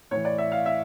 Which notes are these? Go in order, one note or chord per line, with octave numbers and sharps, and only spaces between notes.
A2 E3 C#5
D5
E5
F5
E5